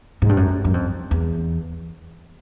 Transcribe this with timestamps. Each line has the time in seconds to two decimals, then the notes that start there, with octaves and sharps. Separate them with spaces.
0.22 G#2
0.29 G2
0.37 F#2
0.65 F#2
0.74 F2
1.11 E2